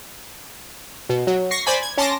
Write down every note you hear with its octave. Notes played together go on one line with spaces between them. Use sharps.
B2
F#3
C#6 A#6 C7
C5 D5 G#5 B5
G#6
C#4 A5 C6 D6 A#6